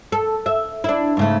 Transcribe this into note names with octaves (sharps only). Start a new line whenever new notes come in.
A4
E5
D4 E4
G#2 C#3 A3